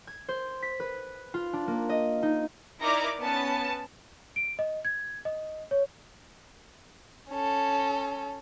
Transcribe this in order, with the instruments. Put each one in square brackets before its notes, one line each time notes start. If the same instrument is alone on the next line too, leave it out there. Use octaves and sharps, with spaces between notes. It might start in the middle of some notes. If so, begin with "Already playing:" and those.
[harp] G#6
C5
B6
B4
F4
D4
A#3
D#5
D#4
[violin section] D#4 E4 A#4 D5 A#5 D6
B3 C#4 A5
[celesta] D7
D#5
G#6
D#5
C#5
[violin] C#4 A4